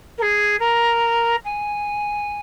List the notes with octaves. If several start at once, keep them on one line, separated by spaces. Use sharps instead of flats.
A#4
G#4
A#4
G#5